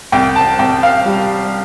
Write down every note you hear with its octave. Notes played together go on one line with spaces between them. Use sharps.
C2 G5
A5
C2 G5
F5
G3